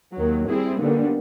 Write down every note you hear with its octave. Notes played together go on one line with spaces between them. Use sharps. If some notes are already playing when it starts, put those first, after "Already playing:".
D#2 D#3 F#3
G3 C4 E4 G#4
D#2 D3 G3 B3